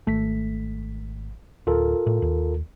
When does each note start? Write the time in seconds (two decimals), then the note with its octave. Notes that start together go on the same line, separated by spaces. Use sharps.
0.07 G#1 A3 B6
1.67 D1 F4 A4 A#4
2.06 A2
2.22 D#2